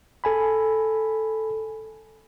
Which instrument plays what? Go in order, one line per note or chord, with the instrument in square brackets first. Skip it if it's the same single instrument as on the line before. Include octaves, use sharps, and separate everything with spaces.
[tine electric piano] A4 G#5 B5